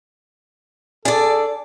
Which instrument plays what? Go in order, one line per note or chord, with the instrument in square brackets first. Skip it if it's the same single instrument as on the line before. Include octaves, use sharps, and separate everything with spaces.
[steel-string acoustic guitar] D4 D5 [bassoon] G#4 [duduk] A4